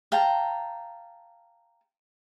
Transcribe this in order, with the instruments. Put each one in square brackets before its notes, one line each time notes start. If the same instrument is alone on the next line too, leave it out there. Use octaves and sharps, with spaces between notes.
[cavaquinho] F5 G5 A5 A#5